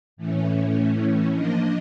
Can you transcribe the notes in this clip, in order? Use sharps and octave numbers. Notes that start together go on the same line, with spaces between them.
A2 E3 A3 C#4
F3 A#3 D4 D#5